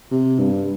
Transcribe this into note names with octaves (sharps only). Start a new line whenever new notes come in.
C3
G2